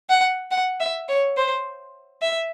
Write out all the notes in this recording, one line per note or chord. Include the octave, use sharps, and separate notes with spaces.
F#5
F#5
E5
C#5
C5
E5